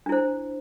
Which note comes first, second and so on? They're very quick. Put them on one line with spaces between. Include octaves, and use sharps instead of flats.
D4 E4 C5